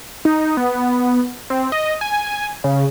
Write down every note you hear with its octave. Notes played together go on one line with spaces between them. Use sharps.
D#4
B3
C4
D#5
G#5
C#3